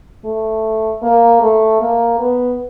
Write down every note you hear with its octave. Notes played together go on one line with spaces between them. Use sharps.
A3
A#3
A3
A#3
B3